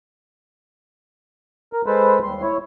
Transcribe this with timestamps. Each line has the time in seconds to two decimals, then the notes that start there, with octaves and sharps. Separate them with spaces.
1.73 A#4
1.86 G#3 A4 B4 C5
2.23 D#2 G3 C6
2.42 E4 C#5